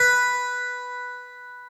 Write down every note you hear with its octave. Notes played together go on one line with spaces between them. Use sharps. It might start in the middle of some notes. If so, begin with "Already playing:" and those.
Already playing: B4